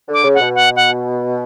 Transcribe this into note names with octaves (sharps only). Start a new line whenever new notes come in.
D3
D6
C#3
F#5
B2
F#5
F#5